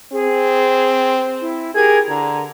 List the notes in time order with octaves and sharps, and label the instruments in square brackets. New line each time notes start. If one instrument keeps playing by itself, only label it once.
[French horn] C4 [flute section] G#4
[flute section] E4
[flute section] G4 A#4 G#6 [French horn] G#4
[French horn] D3 [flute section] A#5